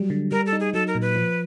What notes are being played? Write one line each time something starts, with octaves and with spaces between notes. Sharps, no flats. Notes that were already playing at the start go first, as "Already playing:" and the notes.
Already playing: F#3 G3
D3
G3 A#4
A4
D#4
G#4
F#3 A4
A#4
A#2
B4
F3